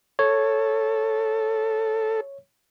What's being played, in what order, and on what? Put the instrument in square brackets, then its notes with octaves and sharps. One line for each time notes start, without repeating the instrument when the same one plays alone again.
[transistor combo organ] A4 [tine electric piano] C#5